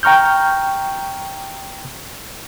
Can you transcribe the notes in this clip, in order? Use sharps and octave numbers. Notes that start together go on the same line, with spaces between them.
G5 A#5 C#6 F6 G6